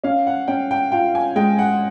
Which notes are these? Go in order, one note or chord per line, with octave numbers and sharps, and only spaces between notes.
C#4 F5
F#5
C#4 G5
G5
F4 G5
G#5
G#3 G5
F#5